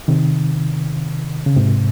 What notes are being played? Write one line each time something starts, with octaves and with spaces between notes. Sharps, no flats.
C3 D#3
C#3
G#2 C3